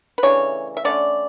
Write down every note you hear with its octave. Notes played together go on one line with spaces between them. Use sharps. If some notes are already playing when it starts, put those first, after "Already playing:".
B4
C#3 E3 A3 D4 C#5
E5
D3 A3 C#4 D5